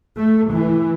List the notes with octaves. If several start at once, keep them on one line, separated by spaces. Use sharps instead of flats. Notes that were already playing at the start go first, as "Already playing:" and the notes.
A3
E3